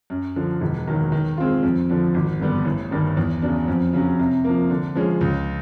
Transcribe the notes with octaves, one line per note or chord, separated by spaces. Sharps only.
F#2
D3 F3
E1
D#2 D#3 F#3
D#3
G#3 C4 F4
F2
D3 F3
G#1
G2 D3 G3 B3
A1
G2 D#3 G3
E2
C#3 F#3 B3 D4
F2
C#3 F#3
C3
F3 A#3
D3
F3 G#3 C#4
C#2